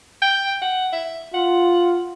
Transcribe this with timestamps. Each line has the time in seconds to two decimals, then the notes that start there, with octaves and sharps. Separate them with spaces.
0.22 G5
0.62 F#5
0.93 E5
1.34 F4 F#5